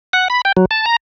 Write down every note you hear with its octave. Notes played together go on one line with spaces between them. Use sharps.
F#5
B5
G5
F#3
A5
A#5